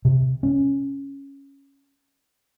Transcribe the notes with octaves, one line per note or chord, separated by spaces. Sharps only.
C3
C#4